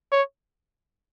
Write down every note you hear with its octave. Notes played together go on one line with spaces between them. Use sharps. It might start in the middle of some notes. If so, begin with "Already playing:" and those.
C#5